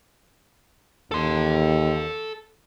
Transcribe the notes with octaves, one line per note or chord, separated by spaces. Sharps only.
D#2 A4 C6